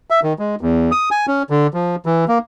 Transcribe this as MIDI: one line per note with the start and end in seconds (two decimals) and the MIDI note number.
0.10 0.20 76
0.23 0.33 51
0.39 0.55 56
0.61 0.91 40
0.92 1.09 87
1.11 1.26 80
1.28 1.43 61
1.50 1.67 50
1.74 1.96 53
2.06 2.25 52
2.28 2.38 58